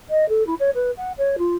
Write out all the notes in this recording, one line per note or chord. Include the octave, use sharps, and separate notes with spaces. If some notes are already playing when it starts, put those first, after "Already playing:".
D#5
A4
E4
C#5
B4
F#5
C#5
F4